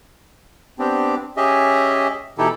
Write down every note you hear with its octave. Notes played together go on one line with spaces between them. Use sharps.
B3 C4 D4 G4
C#4 G4 G#4 D#5 E5
B2 E3 D#4 E4 G4 A4